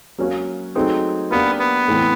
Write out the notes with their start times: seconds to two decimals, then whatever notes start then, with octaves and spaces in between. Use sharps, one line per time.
0.18 F#3 A#3 C#4 F#4
0.75 F#3 A3 C4 D#4 G#4
1.31 A#3 B3 D4 G4
1.59 B3
1.88 A2 E3 A3 C4